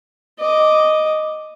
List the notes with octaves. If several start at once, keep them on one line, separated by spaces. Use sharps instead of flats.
D#5 D6